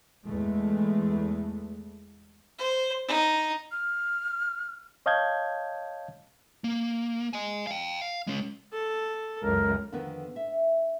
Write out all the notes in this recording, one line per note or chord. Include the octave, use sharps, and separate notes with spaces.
E2 E3 G#3 A3
C5
D#4
F6
C#5 D#5 F5 A5 G6 G#6
A#3
D#5 G#5
F5 G5
F5
G#3 C#4
A4
C#2 F#2 A#4
F2 D3 D#3 B3 A#4 B4
E5